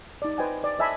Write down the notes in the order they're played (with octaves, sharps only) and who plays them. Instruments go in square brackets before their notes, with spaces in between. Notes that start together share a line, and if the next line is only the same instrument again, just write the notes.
[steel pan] D#4 D5
B4 C5 D#5 G5 G#5
D5
C5 D#5 E5 G#5 A5 B5